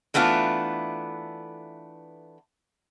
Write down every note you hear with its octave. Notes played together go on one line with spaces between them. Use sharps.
E3 A3 B3 D4 F4